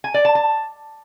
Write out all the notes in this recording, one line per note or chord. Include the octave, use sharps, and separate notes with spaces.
G#5
D5
A5
A5